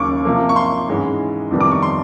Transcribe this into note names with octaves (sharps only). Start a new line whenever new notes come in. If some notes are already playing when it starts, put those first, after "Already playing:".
Already playing: D#2 C#3 F#3 A#3 C#4 C#6 D6
C3 F3 A#3
C#6
C6
G#2 E3 G#3 C#4
F2 C3 D#3 G3 B3
D6
C#6
C6